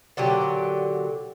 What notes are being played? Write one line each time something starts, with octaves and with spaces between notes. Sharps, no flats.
A#2 D3 F#3 G4